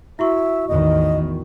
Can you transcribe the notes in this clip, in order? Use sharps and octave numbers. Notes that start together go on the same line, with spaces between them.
E4 F#4 E5 C#6
A1 E2 D#3 D#5